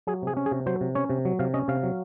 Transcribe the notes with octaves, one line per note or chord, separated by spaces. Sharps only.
F#3 G#4
C3 G#4
C#4
G#4
C3
F#3 C5
C3
C#4 C#5
C3
F#3
C3 F5
C#4 D#5
C3 F5
F#3